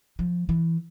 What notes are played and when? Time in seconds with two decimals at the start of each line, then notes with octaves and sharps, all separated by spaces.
0.19 F3
0.49 E3